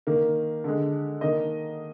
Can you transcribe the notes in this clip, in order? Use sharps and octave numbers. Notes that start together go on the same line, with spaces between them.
D#3 A#3
D3 G#3
D#3 A#3 D#5